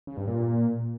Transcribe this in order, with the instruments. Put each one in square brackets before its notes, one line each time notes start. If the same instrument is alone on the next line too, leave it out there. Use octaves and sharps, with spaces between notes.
[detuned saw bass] C#3
G2
A#2